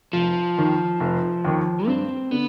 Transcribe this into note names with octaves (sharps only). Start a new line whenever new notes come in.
F1 F3
D#2 D#3
F1
D#2 D#3
G2 C4
D3 B3